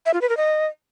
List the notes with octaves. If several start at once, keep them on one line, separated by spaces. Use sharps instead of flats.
E5
F4
B4
A#4
D#5